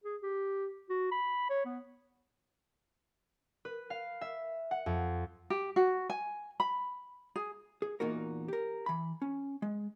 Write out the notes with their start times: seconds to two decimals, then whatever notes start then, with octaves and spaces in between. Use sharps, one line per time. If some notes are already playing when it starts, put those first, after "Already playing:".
0.04 G#4
0.23 G4
0.90 F#4
1.12 B5
1.50 C#5
1.65 B3
3.65 B4
3.90 F5
4.21 E5
4.71 F#5
4.86 F2
5.50 G4
5.76 F#4
6.10 G#5
6.60 B5
7.36 G#4
7.82 G#4
8.00 E2 A#2 A#3 D#4 F#4 A#4
8.48 G4 A#4
8.86 E3 B5
9.22 C#4
9.62 G#3